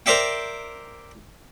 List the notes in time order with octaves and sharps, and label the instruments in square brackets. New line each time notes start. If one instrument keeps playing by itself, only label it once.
[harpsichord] A#4 C5 D5 E5 G5